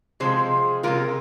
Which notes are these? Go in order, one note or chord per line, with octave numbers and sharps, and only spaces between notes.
C3 F3 G#3 G#4 C5
C3 F3 G#3 F4 A#4